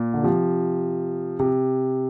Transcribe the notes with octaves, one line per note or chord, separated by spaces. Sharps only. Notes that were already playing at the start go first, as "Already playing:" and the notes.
Already playing: A#2
D3
C3 F3
C3